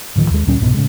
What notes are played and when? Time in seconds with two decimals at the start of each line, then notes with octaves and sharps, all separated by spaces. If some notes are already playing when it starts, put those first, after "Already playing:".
0.16 D1 A2 D#3 F3
0.30 D#2 G#3
0.47 D2 A#2 G3 C#4
0.60 C2 G#2 B2 B3
0.74 A2 C#3 G#3